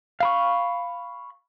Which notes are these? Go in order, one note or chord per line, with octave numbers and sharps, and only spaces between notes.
F5 B5 C#6